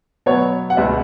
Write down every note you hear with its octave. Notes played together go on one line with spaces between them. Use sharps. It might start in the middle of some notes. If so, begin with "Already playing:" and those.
B2 F#3 B3 C#5
F#5
C#2 B2 B3 E5